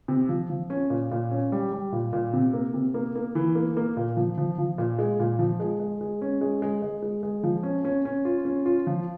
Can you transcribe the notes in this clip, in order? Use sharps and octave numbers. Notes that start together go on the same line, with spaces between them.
C3
F3
F3
C#4
A#2
A#2
C#4
G3
G3
A#2
A#2
C3
A#3
C3
A#3
A#3
E3
A#3
A#3
A#2
F3
F3
F3
A#2
G#3
A#2
F3
G#3
G#3
G#3
C#4
G#3
G#3
G#3
G#3
G#3
F3
C#4
C#4
C#4
F4
C#4
F4
F3